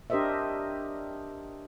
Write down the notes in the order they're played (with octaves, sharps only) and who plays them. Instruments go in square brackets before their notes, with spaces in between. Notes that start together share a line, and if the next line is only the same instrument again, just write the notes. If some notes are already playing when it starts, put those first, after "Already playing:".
[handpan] D4 G4 A#4 C5 D#5 E5